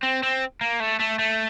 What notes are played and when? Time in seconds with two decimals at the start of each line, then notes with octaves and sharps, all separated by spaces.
0.03 C4
0.23 C4
0.61 A#3
0.80 A3
1.00 A3
1.19 A3